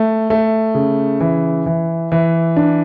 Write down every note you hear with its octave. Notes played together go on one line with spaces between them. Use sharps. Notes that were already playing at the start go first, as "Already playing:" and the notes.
Already playing: A3
A3
C#3
E3
E3
E3
D4